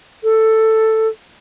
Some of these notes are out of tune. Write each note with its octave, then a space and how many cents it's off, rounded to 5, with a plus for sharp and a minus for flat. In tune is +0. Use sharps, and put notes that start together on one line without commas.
A4 +5